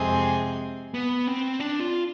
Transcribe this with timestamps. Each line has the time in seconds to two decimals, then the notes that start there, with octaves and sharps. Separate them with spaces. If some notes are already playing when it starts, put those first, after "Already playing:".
Already playing: F2 C3 G#3 C4 G#4
0.94 B3
1.27 C4
1.59 D4
1.80 F4